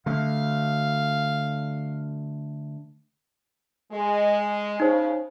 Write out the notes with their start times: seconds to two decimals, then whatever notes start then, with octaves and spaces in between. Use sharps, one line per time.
0.06 D3 A3 F5
3.92 G#3
4.80 C#3 D#4 C5